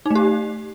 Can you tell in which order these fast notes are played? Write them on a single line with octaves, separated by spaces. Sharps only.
D#4 A3 G4